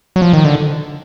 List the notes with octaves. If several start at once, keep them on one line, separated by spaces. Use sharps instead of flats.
F#3
F3
D#3
D3